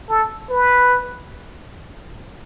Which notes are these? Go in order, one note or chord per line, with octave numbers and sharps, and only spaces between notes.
A4
B4